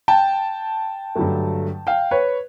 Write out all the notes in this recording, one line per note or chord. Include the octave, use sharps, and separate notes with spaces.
G5 A5
G2 D3 F#3 A3
F5 G5
B4 C#5